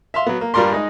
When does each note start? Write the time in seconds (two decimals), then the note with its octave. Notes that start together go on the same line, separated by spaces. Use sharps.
0.14 E5 F5 C6
0.26 F#3 B3
0.41 A#3
0.54 G2 G3 F4 A#4 D5 C6
0.72 G#3 D#4